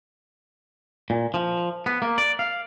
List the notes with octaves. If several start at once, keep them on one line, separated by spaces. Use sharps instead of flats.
A#2
F3
B3
A#3
D5
F5